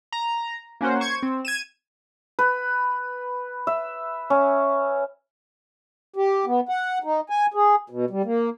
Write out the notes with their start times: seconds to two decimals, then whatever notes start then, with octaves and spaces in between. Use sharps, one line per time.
0.13 A#5
0.81 A#3 C#4 F#4 C5
1.00 C5 C#6 G#6
1.23 C4
1.45 G#6 D#7 E7
2.39 B4
3.67 E5
4.30 C#4
6.16 G4
6.46 B3
6.69 F#5
7.04 D#4
7.30 G#5
7.54 G#4
7.90 B2
8.10 G3
8.25 A#3